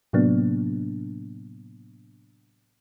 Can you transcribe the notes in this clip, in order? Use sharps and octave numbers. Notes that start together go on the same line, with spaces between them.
A2 C3 F#3 A#3 B3 D4